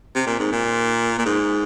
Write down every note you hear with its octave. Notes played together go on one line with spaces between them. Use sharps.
C3
A#2
G#2
A#2
A#2
G#2